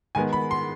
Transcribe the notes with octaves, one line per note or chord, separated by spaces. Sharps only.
D#3 G#3 B3 G#5
B5
C6